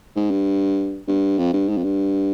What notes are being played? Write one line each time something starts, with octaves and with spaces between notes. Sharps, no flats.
G#2
G2
G2
F2
G2
G#2
F2
G2